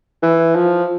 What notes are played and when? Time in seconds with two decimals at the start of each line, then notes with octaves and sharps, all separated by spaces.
0.23 E3
0.55 F3